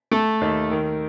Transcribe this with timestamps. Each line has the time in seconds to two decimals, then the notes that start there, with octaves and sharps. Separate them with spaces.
0.11 A3 A4
0.41 D#2
0.71 D#3